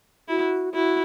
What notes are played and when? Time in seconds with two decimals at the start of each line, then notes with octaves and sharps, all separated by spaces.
0.28 E4 F#4
0.73 E4 F#4